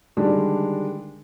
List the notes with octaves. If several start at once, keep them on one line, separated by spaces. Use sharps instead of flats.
D3 D#3 G3 G#3 D4